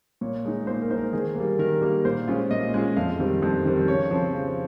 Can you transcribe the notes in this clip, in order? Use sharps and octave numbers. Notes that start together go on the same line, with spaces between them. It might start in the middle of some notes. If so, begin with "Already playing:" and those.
A#2 C#5
G#3 D#4
A#2 C5
A#4
G#3 D#4 A#4 C5
D#3 G#4
G3 A#3
D#3 A#4
G3 A#3
A#2 C5
G#3 C#4 F4
A#2 D#5
G#3 C#4 F4
F2 F5
D#3 G3 C4
F2
D#3 G3 C4
C#3 C#5
F3 C4
C#3